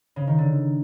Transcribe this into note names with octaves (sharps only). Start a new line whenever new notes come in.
C#3
D#3
D3